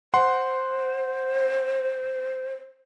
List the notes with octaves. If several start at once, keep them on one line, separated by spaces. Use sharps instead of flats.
C5 F#5 C6